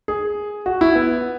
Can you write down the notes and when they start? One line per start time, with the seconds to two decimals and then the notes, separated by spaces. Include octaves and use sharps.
0.08 G#4
0.66 F#4
0.81 E4
0.95 B3